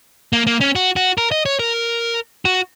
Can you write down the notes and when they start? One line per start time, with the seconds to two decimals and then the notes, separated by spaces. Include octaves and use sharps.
0.33 A#3
0.47 A#3
0.60 C#4
0.75 F#4
0.96 F#4
1.18 A#4
1.32 D#5
1.46 C#5
1.59 A#4
2.45 F#4